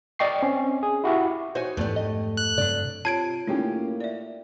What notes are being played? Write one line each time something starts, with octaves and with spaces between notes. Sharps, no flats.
D5 D#5 G5 C#6 C7
C4 C#4
G#4
E4 F#4 G4 E5
D#4 F#4 C5 C#5 G#5
F2 G#2 E3 A3 B3 G4 D5
D#5
F#6
G2 C3 F#3 D4 D5
C3 F4 C#5 A5 G#6 D7
A2 A#3 C#4 D#4 F4 G4
D5 E5